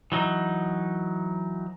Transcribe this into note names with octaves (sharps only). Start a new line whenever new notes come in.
E3 F#3 D#4